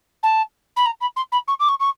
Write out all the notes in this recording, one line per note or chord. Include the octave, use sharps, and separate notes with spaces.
A5
B5
A#5
B5
C6
B5
C#6
D6
C#6
C#6